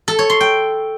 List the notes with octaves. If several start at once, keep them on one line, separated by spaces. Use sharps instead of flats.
A4
C#5
C6
G5